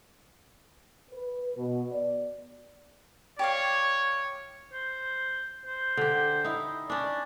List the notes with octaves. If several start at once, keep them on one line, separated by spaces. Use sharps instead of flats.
B4
B2
D5
G4 C#5 D5 F5
C5
C5
D3 G4
D#4 E4
C#4 D4 D5